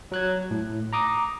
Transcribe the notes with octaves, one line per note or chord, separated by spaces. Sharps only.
F#3 F#6 G#6
A2
A#5 D6 D#6